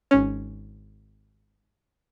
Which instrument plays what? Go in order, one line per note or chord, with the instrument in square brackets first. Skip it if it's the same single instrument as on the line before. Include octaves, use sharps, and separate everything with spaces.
[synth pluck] G#1 C#4